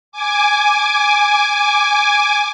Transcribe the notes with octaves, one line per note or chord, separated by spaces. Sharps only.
G#5 D6